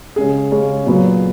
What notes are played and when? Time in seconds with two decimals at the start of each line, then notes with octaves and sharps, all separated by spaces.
0.16 C#3 G#3 C#4 G#4
0.51 C#3 G#3 C#4
0.86 A#2 F#3 B3